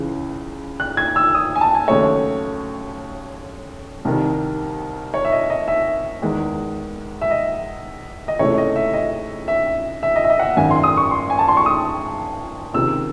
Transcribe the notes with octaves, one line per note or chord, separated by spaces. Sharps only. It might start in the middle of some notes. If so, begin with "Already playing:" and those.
Already playing: C#2 C#3 E3
F#6
G#6
E6
D#6
G#5
A5
G#5
D#2 C#3 F#3 A3 C#5
C2 C3 D#3
C#5
E5
D#5
D#5
E5
E2 D#3 G#3
E5
D#5
D#5
C#2 C3 E3 A3 C#5
D#5
E5
D#5
E5
E5
D#5
E5
D#5
F#5
E5
G#1 F#2 D#3 G#5
C6
D#6
C#6
C6
G#5
A5
C6
C#6
D#6
C#2 C3 D#3 E6